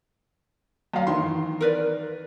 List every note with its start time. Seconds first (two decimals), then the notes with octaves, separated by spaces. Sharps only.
0.94 F#2 F5
1.07 D#3 E3 C6
1.61 A#4 B4 D5